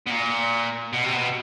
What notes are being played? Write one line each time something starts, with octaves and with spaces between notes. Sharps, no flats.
B2
A#2
B2
C3
B2